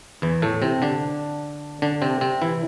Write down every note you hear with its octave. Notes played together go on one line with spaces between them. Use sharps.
E2 E3
A2 A3
C3 C4
D3 D4
D3 D4
C3 C4
C3 C4
E3 E4